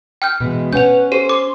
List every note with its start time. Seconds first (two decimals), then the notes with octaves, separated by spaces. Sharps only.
0.22 G5 F6 G6
0.40 B2 E3 G#3
0.73 C#4 B4 F#5 G6 F7
1.12 G4 A4 C5 D#7 E7
1.29 C6 D6